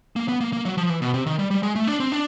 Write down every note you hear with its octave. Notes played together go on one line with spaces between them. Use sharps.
A#3
B3
A#3
A#3
F#3
F3
E3
B2
C3
D#3
G3
G3
G#3
A3
D4
C4
D4